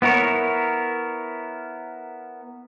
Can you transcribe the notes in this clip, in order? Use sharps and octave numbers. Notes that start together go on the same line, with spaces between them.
B3 E4 A#4 C#5